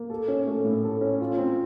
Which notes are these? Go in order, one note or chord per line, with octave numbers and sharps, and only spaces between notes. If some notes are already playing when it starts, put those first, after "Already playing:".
Already playing: A#3
A4
C#4
A3
A2
A4
C#4
F4
C4